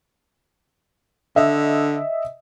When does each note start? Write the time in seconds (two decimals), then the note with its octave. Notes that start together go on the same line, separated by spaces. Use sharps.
1.36 D3 D#5 E5